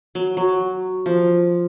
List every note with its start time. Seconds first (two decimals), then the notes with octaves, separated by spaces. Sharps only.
0.15 F#3
0.37 F#3
1.06 F3